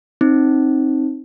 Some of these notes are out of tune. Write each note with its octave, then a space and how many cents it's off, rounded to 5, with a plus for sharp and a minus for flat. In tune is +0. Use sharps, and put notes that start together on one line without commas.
C4 +25 D#4 +0